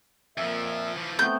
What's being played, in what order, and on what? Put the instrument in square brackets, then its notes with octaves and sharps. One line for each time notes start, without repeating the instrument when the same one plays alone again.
[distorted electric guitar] F2 F3 [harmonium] A#2 E5
[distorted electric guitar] E3 F3
[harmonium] A3 B3 C4 [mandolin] G6